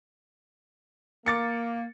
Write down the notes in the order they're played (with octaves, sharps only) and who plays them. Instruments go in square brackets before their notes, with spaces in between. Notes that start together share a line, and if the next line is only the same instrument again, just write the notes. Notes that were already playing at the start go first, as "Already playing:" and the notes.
[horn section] A#3 [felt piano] D6 A6 C#7